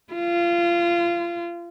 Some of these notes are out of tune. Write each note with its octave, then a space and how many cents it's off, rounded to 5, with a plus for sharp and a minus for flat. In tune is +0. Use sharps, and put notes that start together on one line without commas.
F4 -25